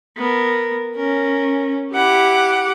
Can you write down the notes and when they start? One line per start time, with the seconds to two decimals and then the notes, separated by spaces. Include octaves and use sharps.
0.17 B3 A#4
0.96 C#4 A#4
1.92 E4 G4 F#5 D6